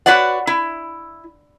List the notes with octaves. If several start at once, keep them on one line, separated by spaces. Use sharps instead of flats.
F#4 B4 C#5 D5 F#5
E4